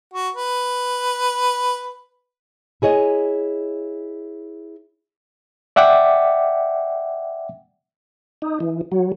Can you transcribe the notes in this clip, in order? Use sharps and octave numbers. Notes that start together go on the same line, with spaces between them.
F#4
B4
E4 G#4 C#5 D#5
D5 E5 F#5 G5 D6
D#4
E3
F#3